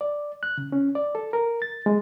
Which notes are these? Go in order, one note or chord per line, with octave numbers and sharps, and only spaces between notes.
D5
F#6
C#3
C#4
D5
A4
A#4
A6
G#3